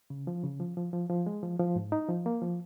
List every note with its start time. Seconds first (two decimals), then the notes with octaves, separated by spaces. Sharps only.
0.10 C#3
0.27 F3
0.44 C#3
0.60 F3
0.77 F3
0.93 F3
1.09 F3
1.26 G#3
1.43 F3
1.59 F3
1.76 G#2
1.92 D#4
2.09 F3
2.26 A#3
2.42 F3